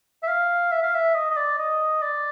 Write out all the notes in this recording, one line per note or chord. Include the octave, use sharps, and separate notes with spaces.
E5
F5
E5
F5
E5
D#5
D#5
D5
D#5
D5